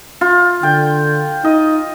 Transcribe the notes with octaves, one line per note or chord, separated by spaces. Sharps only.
F4
D3 G5
D#4 D#5